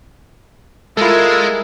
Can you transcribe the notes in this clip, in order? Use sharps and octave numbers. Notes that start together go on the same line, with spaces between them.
G#3 E4 F4 A4 A#4